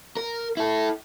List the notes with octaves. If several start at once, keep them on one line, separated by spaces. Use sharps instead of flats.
A#4
E4 A4